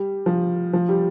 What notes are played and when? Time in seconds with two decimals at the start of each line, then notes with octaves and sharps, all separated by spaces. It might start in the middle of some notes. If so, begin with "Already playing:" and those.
Already playing: G3
0.26 F3
0.73 F3
0.89 G3